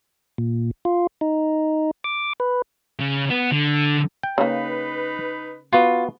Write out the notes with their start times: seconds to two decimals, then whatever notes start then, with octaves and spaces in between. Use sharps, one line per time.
0.38 A#2
0.85 F4
1.21 D#4
2.04 D6
2.40 B4
3.00 C#3
3.30 B3
3.52 D3
4.23 G5
4.38 C#3 A#3 D#4 B4
5.73 B3 F4 F#4